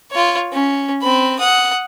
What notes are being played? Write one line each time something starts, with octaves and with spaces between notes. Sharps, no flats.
F4 C#5
C#4
C4 B5
F#5 D#6